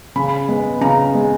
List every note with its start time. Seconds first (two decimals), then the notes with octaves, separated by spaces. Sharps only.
0.16 C#3 B5
0.48 G#3 B3
0.81 C#3 A#5
1.14 G#3 B3